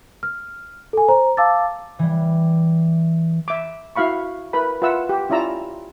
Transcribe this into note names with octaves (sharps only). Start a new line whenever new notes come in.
F6
A4 G#5
C5 A#5
F5 A5 D6 E6 A6
E3 G3
E5 D6
E4 F#4 F5 B5 C#6
E4 A#4 B4 B5
F4 B4 E5 F#5 E6
G4
C#4 E4 F4 D5 A#5 E6